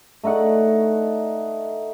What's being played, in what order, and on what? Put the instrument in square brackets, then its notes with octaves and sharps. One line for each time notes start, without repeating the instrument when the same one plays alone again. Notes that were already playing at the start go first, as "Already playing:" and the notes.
[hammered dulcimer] A3 D#4 D5 F#5